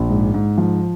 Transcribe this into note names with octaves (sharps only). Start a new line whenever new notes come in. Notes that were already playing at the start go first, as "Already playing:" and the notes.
Already playing: A#1
G#2
G#2
F3